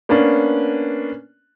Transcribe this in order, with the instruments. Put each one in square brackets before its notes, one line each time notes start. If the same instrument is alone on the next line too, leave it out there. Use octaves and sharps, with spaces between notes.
[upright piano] A#3 B3 C#4 D4